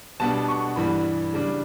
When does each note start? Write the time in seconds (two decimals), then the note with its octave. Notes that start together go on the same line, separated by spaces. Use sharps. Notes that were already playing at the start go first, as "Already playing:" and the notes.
0.20 B2 G3 B3 D4 A5
0.48 C#6
0.76 G2 E3 G3 B5
1.33 C#3 G3 D4